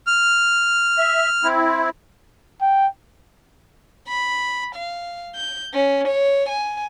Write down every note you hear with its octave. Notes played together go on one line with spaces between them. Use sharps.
F6
E5
C4 E4
G5
B5
F5
G6
C#4
C#5
G#5